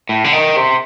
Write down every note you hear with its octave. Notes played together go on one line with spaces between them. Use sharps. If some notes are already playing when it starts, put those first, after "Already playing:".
A2
D3
D#3
C3